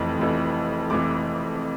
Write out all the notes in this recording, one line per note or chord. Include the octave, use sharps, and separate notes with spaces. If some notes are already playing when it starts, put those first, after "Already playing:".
Already playing: F1 F2 E3
F1 F2 E3
F1 F2 E3 D6